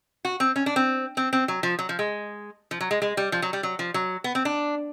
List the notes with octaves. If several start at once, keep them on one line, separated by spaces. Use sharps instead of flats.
F#4
C4
C#4
D4
C4
C4
C4
F#3
F3
F#3
F3
G#3
F3
F#3
G#3
G#3
G3
F3
F#3
G3
F#3
F3
F#3
B3
C4
D4